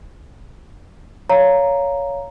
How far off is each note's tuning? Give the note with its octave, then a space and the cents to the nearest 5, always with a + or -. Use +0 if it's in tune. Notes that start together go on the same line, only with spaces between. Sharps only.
C#5 +15 F5 +0 A#5 +0